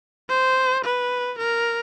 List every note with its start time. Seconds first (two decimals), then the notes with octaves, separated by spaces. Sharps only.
0.29 C5
0.84 B4
1.38 A#4